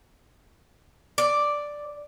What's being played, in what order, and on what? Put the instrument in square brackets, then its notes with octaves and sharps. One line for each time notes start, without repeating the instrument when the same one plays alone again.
[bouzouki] D5